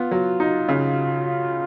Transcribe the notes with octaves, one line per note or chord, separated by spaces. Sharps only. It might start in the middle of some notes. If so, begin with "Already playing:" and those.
Already playing: B3 F4
F#3
D#4
C#3